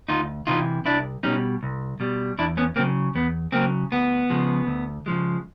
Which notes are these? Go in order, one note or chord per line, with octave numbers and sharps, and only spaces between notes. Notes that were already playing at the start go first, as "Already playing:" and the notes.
D2 D#4 F4
C3 E3 D#4 F4
C2 D4 E4
B2 G3 C#4 D#4
C2
B2 G3
E2 D4 E4
B3 C#4
C#3 F#3 A#3 C4
E2 B3
C#3 F#3 A#3 C4
D2 B3
C#3 F3 G#3
D2
C#3 F3 G#3